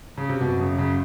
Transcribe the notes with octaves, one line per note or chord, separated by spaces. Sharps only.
C#3
C3
F#2 B2
C#3
C#3